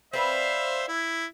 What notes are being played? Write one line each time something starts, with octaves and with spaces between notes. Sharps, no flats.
C4 B4 C5 D5 E5 F5
E4